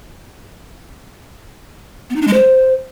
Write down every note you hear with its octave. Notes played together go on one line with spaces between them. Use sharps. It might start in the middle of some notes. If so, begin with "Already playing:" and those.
B3
D#4
D4
G#3
C5